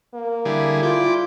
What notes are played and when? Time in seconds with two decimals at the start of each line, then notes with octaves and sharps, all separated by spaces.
0.14 A#3
0.45 D3 G3 E4 G#4
0.83 F4 D5 G5